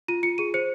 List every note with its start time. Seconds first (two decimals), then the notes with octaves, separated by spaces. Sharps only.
0.08 F4 D#7
0.23 F4 C#7
0.38 G#4 D#7
0.54 C5 C#7